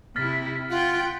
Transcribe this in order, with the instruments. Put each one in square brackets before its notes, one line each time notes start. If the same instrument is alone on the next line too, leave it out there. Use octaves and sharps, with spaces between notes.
[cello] C3 E4 [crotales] F6 A6 B6
[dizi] F4 [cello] F#5 G5